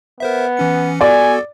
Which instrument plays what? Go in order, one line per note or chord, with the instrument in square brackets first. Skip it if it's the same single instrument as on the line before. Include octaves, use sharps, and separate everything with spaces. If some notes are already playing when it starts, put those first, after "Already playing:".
[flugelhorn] B3 [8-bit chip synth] A#4 C5 E5
[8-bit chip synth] E3 C#4 C#7
[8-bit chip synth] B3 F#4 A4 [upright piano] D5 [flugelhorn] G#5